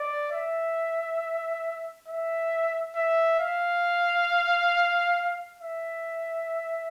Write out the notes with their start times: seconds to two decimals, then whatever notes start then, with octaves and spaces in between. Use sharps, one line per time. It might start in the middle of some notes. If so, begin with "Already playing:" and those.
Already playing: D5
0.32 E5
2.08 E5
2.96 E5
3.40 F5
5.60 E5